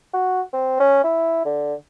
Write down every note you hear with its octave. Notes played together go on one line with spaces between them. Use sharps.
F#4
C4
C#4
E4
D3